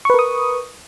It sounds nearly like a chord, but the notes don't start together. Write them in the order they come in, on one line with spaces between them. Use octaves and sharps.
C#6 B4 A#4 D#6